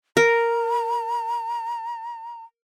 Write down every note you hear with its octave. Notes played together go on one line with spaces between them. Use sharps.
A#4 A#5